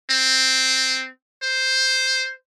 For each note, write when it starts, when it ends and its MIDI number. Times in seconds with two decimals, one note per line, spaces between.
0.10 1.08 60
1.43 2.32 72